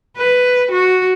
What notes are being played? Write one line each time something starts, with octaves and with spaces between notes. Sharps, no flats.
B4
F#4